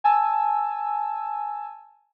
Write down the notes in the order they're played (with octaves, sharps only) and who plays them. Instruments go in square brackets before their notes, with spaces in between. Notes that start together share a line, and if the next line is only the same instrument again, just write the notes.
[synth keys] G#5 A5 E6